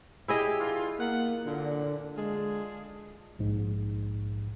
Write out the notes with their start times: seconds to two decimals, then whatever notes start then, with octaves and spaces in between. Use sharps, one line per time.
0.28 E4 G4 G#4 D#5
0.60 D3 E3 F4
0.99 A#3 B3 F5 F#5
1.45 F#2 A#2 D3
2.16 D3 G#3 D4 F4 G#4
3.39 A#1 G#2